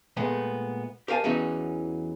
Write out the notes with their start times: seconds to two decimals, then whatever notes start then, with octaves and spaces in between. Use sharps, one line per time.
0.17 A#2 G#3 A3 B3
1.08 G4 A#4 F5 G#5 A5
1.24 E2 E3 F#3 C#4 D#4